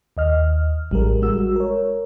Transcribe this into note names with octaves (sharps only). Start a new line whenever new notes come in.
D#2 D#5 F6
A1 G3 G#3 A#4
G#3 F#4 E6
A#4 C#5